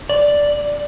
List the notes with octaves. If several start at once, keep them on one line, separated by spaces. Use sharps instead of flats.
D5